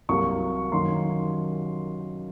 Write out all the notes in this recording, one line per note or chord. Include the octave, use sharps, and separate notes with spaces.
C2 C3 F#3 A#3 C#6
F#2 D#3 A#3 C6